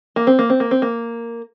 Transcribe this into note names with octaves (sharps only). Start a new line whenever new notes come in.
A#3
C4
A#3
C4
A#3
C4
A#3